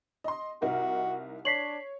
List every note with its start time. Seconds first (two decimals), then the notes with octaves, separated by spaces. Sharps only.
0.24 D#5 C6
0.62 C2 D#4 F#4 A#4
1.45 D4 C#5 B6 C7 F#7